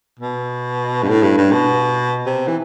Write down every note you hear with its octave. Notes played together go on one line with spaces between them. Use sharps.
B2
G2
A2
G2
G2
B2
C3
E3